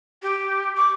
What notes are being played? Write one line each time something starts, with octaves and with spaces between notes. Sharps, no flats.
G4
C#6 D6